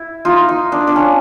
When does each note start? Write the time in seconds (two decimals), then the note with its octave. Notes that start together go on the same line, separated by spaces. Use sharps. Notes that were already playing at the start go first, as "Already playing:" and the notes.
Already playing: E4
0.25 D#4 F4
0.49 D#4
0.72 D4
0.87 D4
0.96 C#4